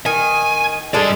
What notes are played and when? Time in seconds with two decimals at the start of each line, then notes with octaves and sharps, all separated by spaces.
0.06 D#3 G#5
0.94 G2 G#3 D4 A4 D5